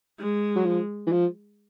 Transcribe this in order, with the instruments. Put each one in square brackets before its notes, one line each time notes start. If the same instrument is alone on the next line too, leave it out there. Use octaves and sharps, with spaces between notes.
[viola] G#3
[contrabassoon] F#3
F3
E3
F3